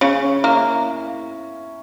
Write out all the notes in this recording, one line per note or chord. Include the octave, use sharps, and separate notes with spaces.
C#3 C#4
A#3 E4